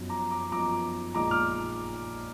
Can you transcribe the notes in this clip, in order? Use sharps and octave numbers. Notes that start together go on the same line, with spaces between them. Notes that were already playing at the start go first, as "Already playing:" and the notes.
Already playing: F#2 F3 B3 D#4
A#5 D6
A#5 D6
F#2 F3 B3 D#4 A#5 D6
A#1 A#2 G#3 D#4 A#5 D6
D6 F6